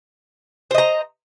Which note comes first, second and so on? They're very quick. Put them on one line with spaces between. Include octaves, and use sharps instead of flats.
C5 D#5 A#5